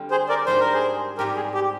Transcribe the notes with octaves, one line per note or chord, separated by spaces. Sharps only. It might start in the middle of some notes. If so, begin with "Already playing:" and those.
Already playing: D3 G3 C4 F4
G#4 C5
A#4 D5
G#2 G3 D4 F4 C5
A#4
G#4 C5
G#2 G3 C4 G4 A#4
G#4
G4